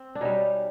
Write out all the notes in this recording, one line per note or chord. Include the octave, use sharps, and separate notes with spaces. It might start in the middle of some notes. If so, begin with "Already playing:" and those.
Already playing: C4
D4
B2 G3 C#4 D#4